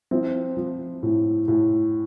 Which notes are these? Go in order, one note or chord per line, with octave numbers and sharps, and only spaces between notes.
F3 C4 E4
F3
A2
A2